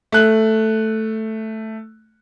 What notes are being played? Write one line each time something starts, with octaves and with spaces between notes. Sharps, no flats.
A3 F#6